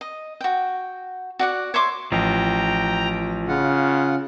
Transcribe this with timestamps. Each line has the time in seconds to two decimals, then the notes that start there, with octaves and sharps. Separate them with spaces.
0.01 D#5
0.41 F#4 G5
1.39 F#4 D5 F#5
1.74 C#5 E5 C6 D6
2.12 A1 F3 G5 A#5
3.48 C#3 F4 F#5